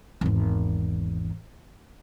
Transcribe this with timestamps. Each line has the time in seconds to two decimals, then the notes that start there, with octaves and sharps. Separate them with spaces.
0.21 G#1 E2